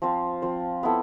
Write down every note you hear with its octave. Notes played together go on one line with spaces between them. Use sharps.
F3 C4 F4 C5
F3 C4 F4 C5
B3 E4 A4